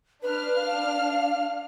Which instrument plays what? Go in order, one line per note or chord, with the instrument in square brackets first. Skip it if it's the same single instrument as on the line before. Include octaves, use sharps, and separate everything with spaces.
[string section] D4 F6 [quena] B4
[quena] F5